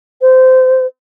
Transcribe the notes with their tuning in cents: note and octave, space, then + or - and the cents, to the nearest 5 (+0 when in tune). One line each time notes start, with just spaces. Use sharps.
C5 -20